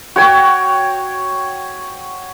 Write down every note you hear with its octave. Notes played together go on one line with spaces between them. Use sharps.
F#4 C#5 G5